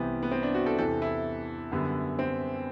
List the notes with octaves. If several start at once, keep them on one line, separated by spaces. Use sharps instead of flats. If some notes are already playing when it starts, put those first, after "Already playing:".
Already playing: C2 C3 E3 B3 C4
B3
C4
D4
F#4
A4
E2 C3 E3 A4
E4
F#2 D3 G3 B3
C4